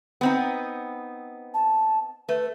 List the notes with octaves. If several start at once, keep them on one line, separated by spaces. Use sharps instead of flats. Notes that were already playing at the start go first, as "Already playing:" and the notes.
B3 C4 D#4
A5
A3 B4